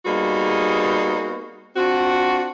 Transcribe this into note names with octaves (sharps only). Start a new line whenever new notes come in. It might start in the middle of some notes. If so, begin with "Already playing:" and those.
G3 A#3 B3 D#4 F#4 G#4
C4 D4 F4 F#4